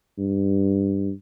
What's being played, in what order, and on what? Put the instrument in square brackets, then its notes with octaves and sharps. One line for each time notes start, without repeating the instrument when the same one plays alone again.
[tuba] G2